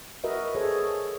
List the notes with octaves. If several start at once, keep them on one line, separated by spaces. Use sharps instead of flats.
F#4 A#4 B4 D#5 E5
G#4 A4 C5 C#5